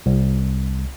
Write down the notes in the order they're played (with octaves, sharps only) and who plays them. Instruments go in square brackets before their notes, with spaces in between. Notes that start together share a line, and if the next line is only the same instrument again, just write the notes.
[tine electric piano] C2